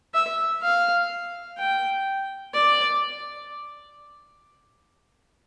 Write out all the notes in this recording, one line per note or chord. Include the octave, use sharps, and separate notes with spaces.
E5
F5
G5
D5